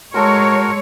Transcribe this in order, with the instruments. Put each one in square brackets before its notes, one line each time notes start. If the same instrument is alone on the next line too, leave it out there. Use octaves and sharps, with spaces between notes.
[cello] G#3 [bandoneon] F#4 A#4 [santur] A4 C6 [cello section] C#5